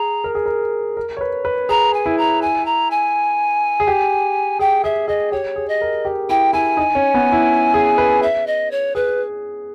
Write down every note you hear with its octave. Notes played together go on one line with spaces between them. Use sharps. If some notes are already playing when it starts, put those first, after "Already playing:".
Already playing: G#4 A#5
A#4
G#4
A#4
A#4
C#5
B4
B4
G#4 A#5
G#5
E4
A#5
G#5
A#5
G#5
G#4
G4
G#4 G5
G#4 E5
G#4 D#5
G4 C#5
G#4
D#5
A#4
G4
E4 G5
E4 G#5
D#4
C#4
B3
E4
G#4
B4
E5
D#5
C#5
G#4 B4